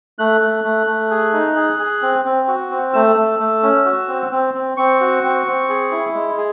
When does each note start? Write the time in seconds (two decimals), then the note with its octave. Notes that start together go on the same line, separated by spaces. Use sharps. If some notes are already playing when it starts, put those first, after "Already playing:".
0.19 A3 F#6
0.41 A3
0.64 A3
0.87 A3
1.11 G#4
1.33 D#4
1.56 G#4
1.79 G#4
2.02 C4
2.25 C4
2.48 F#4
2.71 C4
2.94 A3 E6
3.16 A3
3.39 A3
3.63 C#4
3.85 F#4
4.08 C4
4.31 C4
4.54 C4
4.77 C4 C#6
5.00 F#4
5.24 C4
5.46 C4
5.69 G#4
5.91 E4
6.14 G#3
6.37 G#4